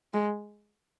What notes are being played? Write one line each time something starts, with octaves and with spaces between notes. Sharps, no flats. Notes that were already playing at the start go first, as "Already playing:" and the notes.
G#3